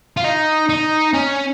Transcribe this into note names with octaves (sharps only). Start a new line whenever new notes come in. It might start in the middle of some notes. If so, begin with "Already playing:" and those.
F4
D#4
D#4
C#4